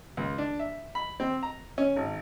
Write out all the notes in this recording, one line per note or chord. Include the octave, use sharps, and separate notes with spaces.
C#2
D4
E5
B5
C4
A#5
C#4
G#1